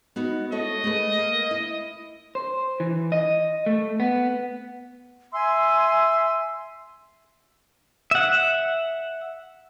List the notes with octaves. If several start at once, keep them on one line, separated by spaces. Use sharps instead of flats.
B3 D#4 F#4
E4 A4 C#5 D#5
A3 G#4 B4
A#3
E4
C5
E3
D#5
A3
B3
E5 G#5 C6 E6
E5 F#5